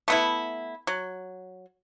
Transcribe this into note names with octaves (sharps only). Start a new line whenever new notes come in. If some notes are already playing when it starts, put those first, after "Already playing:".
A3 B3 E4
F#3